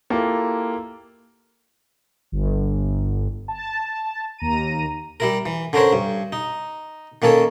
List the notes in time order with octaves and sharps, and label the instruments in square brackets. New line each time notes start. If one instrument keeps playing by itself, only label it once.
[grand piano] A#3 E4 F4 G4 A4
[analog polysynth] G1
A5
D#2 A#5 D#7
[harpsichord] G3 E4 A#4
E3
D3 C#4 A#4 C5 C#5
G2
D#4
D#3 A#3 C#4 A4 C#5